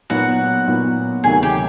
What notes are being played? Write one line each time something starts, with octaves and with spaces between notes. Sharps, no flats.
A#2 F#3 B3 D#4 F#4 F#5
A#2 F#3 B3 D#4
D2 C3 D#3 F#3 G#4 G#5
G4 G5